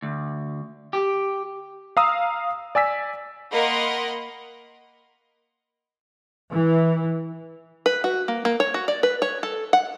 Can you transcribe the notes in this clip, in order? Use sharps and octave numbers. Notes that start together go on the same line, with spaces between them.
D2
G4
F5 A#5 D#6 E6
D5 G#5 E6 B6
A#3 A#4 D#5 F#5 B5 C6
E3
B4
F#4
A#3
A#3
C#5
F#4
D5
B4
C#5
A4
F#5